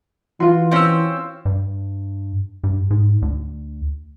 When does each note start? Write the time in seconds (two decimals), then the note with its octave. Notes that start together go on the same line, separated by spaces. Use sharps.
0.40 E3 F4 F#4 C6
0.71 C4 C#4 C5 E6
1.45 G2
2.64 G2
2.90 G#2
3.22 D2